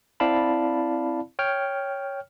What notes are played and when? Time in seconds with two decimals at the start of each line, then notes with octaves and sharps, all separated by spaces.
0.20 C4 E4 D5 F5 A5 B5
1.39 C#5 G5 F6